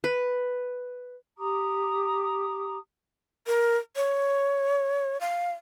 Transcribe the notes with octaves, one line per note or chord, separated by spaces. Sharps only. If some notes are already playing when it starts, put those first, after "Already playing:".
B4
G4 A#5 D6 D#6
A#4
C#5
F5